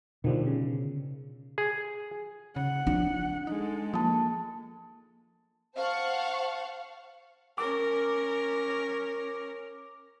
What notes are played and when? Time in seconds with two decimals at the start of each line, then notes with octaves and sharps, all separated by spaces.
0.24 B2 D3 D#3 F3 G3
0.46 C#3
1.58 G#4
2.56 C#3 F#5
2.87 F3 D4
3.47 G#3 D#4 A4
3.94 F3 A#3 A5
5.75 C5 F5 F#5 A5 C#6
7.58 C#4 A#4 D6